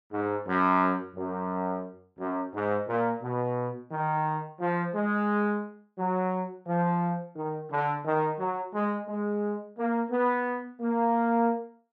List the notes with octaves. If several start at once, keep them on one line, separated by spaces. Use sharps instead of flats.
G#2
F#2
F#2
F#2
G#2
A#2
B2
D#3
F3
G#3
F#3
F3
D#3
D3
D#3
F#3
G#3
G#3
A#3
B3
A#3